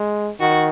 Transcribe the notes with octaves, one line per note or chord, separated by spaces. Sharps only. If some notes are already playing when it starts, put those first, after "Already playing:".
Already playing: G#3
D#3 F#4